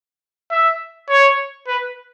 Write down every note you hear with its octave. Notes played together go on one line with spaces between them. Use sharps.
E5
C#5
B4